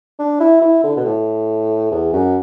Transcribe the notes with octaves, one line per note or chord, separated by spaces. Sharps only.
D4
E4
E4
D3
B2
A2
E2
F#2